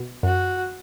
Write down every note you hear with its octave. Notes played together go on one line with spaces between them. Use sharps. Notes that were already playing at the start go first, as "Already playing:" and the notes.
Already playing: B2
F#2 F#4